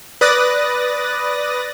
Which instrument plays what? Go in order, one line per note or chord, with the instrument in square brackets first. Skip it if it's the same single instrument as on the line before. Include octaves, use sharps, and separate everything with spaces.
[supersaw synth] B4 D5 D#6 F#6 A6 A#6